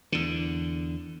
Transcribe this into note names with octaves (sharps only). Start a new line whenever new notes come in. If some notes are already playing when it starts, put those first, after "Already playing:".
E2 D3